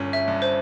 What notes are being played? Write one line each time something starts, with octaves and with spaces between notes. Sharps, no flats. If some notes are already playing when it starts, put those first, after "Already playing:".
Already playing: G1 C#4
E5
G2
C5